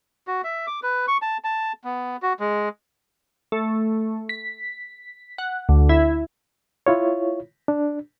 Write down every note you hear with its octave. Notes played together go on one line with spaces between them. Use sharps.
F#4
E5
D6
B4
C#6
A5
A5
B3
F#4
G#3
A3
B6
F#5
D2
E4
E4 F4 C#5
D4